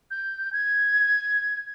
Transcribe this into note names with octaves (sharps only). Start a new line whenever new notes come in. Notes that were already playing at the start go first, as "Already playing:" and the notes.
G6
G#6